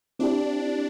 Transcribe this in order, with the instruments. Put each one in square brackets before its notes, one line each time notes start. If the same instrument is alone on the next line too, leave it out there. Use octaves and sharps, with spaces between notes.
[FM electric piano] C4 E4 G4 [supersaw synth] D4